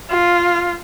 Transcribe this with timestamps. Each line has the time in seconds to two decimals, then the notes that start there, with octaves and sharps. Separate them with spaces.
0.10 F4